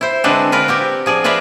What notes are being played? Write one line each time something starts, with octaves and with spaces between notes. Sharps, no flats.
E4 C5
D3 G#3 C4 D4 F#4 B4
F4 A#4 B4
C4 F#4 G4
F3 G#4 D5
F4 B4 D5 E5 A#5